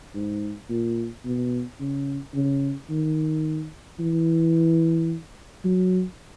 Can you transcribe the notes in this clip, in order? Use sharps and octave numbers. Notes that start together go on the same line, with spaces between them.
G#2
A#2
B2
C#3
C#3
D#3
E3
F#3